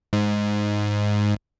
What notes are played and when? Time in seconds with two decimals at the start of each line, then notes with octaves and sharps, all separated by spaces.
0.13 G#2